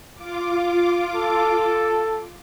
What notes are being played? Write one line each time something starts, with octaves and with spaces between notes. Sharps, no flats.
F4 D6
A4